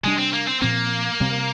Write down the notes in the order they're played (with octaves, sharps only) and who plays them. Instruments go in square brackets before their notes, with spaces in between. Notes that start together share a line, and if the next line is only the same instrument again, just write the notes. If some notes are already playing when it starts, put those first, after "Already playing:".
[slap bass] C3 G3 D4 [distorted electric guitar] G#3
[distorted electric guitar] C4
A#3
C4
[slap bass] A#2 F3 C4 [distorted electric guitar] A#3
[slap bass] C3 G3 C4